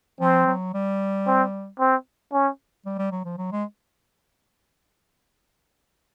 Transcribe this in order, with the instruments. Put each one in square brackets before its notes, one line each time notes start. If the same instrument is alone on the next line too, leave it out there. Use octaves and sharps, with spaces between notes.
[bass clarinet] F3 [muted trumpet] C4
[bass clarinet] F#3
G3
[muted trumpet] C4
C4
C#4
[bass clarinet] G3
G3
F#3
F3
F#3
G#3